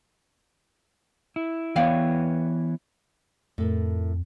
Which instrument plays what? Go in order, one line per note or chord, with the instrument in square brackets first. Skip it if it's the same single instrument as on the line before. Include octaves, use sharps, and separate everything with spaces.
[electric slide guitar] E4
[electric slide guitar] E3 B3 C#5 [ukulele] D5 F5 G5
[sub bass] F2 [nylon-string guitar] A2 A4 A#4